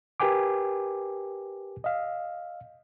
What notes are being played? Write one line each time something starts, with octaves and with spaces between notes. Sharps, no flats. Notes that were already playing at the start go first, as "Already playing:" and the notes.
G4 A#4 B4 G5 G#5 D6
D#5 F5